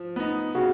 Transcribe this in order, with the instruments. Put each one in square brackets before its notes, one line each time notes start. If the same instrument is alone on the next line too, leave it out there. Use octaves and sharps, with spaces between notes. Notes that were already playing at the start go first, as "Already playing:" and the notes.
Already playing: [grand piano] F3
B3 D#4
[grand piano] C#3 [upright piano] F#4